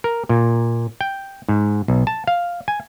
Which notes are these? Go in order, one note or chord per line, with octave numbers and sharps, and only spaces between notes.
A#4
A#2
G5
G#2
B1
A5
F5
G#5